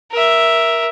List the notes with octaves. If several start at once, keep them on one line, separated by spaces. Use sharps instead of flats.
A#4 E5